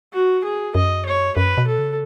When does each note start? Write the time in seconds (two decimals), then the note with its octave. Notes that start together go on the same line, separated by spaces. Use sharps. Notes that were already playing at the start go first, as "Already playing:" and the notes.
0.13 F#4
0.44 G#4
0.75 F#2 D#5
1.06 C#5
1.37 F#2 B4
1.58 B2
1.67 A4
1.79 C#3